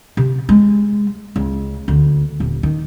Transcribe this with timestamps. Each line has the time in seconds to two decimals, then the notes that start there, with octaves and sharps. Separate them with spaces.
0.17 C3
0.49 G#3
1.36 C#2
1.88 D2
2.40 D#1
2.63 D#3